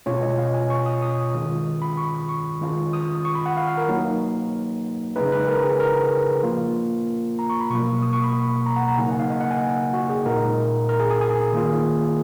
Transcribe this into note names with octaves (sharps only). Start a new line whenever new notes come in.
B2 G#3 C#4 F4 C#5
D#5
F5
G#5
C#6
D#6
D#6
D#3 G#3 C#4 F4
B5
C#6
C#6
D#3 G#3 C#4 F4
D#6
C#6
B5
F#5
F5
F5
A#4
F#3 A#3 D#4
C#3 G#3 D#4 B4
B4
A#4
G#4
A#4
F3 A#3 F4
A#5
C#6
B5
B2 F#3 A#3 C#6
D#6
C#6
B5
A#5
F#5
A#5
C#3 F#3 A#3 D#4 G#5
F#5
F5
D#5
F#5
G#5
F#4
G#4
A#2 G#3 D#4 A#4
A#4
G#4
G#4
G#4
D#3 A#3 F4